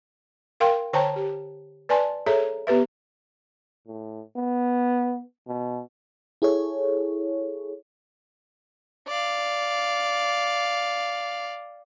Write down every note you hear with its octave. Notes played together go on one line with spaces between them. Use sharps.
A#4 F5 G5 C6
D3 C5 C#5 G5 A5 A#5
G4
B4 D5 G#5 A5 C6
G#4 A4 C#5 E5 A#5
B3 G4 B4 E5
A2
B3
B2
E4 G#4 A4 C#5
D5 F5